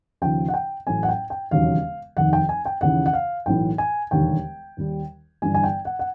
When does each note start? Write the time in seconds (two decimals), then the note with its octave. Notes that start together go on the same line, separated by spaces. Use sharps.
0.22 D#2 C#3 F3 G5
0.48 F#5
0.54 G5
0.87 A1 A2 F#3 G#5
1.03 F#5
1.09 G5
1.30 G5
1.51 E1 D#2 C#3 F#3 F5
2.17 F1 D#2 D#3 F#5
2.33 G5
2.49 G#5
2.65 G5
2.81 D#2 C#3 E3 F#5
3.06 F#5
3.13 F5
3.46 B1 A2 E3 G5
3.78 G#5
4.11 E1 D#2 D3 G3 G5
4.77 D#2 D#3 G3
5.42 G1 G2 E3 G3 G#5
5.54 G#5
5.63 G5
5.85 F#5
5.99 F#5